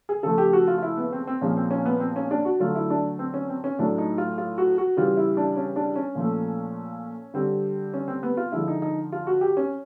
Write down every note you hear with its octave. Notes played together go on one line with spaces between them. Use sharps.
G#4
C#3 F3 A3 A4
G4
F#4
F4
F4
E4
B3
C4
C4
A#2 F3 G#3 C#4
C4
C#4
B3
C4
C#4
D4
F#4
D3 F#3 A3 F4
E4
D4
C4
C#4
C4
C#4
A2 F#3 A3 D4
D#4
F4
F4
F#4
F#4
C#3 E3 G3 F4
E4
D4
C#4
D4
C#4
A#2 F3 A3
D3 G3 C4
C#4
C4
B3
F4
D3 F3 G#3 E4
D#4
D#4
F4
F#4
G4
C#4